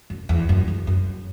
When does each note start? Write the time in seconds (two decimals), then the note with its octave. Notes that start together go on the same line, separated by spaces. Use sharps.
0.10 F#2
0.29 E2
0.49 F#2
0.68 E2
0.87 F#2